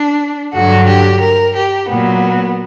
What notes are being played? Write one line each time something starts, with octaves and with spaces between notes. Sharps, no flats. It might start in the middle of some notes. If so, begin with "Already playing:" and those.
Already playing: D4
G2 D3 F#3 F#4
G4
A#4
G4
A#2 F#3 B3